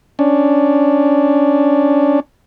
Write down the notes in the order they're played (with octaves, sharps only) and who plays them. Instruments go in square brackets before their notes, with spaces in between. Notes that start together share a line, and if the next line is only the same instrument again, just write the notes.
[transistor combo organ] C#4 D4